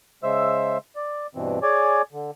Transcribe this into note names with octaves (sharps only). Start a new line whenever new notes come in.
C#3 G#3 C5 E5 E6
D5
G2 B2 E3 C4
G#4 C#5 D5 G#5 D6
D3